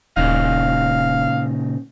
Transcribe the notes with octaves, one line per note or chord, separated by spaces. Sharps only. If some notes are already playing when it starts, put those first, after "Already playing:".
D#1 A#2 C#3 D#4 F5